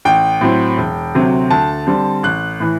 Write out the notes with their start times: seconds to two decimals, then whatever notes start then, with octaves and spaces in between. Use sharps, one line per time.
0.05 A1 G5
0.41 A2 F#3 C4
0.78 E1
1.14 D2 C3 F#3 C4
1.51 D2 A5
1.87 D3 G3 C4
2.23 A1 F#6
2.60 A2 E3